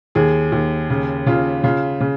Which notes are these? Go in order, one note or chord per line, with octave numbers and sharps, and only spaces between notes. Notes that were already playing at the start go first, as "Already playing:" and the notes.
D#2 G#4
D#2
C#3
C#3 F4
C#3 F4
C#3